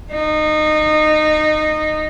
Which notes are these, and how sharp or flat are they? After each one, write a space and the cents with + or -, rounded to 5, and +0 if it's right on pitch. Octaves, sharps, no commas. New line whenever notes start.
D#4 -20